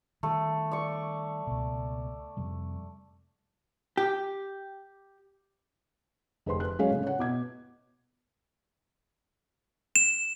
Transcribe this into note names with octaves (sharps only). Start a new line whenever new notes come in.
D#3 G3 A3
D5 C#6
C#2 B2
F2 C3 G3
G4
F1 G#4 B4 C6
F#6
F#3 G#3 C#4 G#4 C#5 F5
A2 C#3
C#5 F#5
B2 D6 G#6
E7